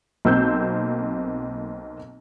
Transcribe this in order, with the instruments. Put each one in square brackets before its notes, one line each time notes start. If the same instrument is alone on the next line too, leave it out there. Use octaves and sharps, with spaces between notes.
[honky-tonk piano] B1 A#3 C4 E6 G6